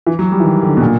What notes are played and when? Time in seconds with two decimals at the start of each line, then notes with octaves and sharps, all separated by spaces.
0.07 E3
0.19 F#3
0.32 G3
0.40 E3
0.44 D#3
0.63 D3
0.77 B2
0.81 A#2